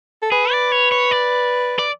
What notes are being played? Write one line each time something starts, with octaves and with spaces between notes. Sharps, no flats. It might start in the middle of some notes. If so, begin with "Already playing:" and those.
A4
G#4 B4
D5
C#5
C#5
D5
D5